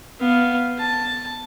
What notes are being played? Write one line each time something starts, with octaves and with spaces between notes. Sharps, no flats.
B3 F5
A5